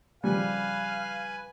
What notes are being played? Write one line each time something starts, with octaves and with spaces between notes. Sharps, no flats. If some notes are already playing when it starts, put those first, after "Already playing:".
C#3 F3 G3 C#4 B4 F5 G#5